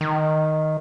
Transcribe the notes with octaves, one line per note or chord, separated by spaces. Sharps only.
D#3